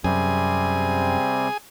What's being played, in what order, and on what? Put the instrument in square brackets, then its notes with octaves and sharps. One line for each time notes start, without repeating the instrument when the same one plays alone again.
[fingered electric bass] F#2 [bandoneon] C3 G3 C4 [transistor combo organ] G#4 G#5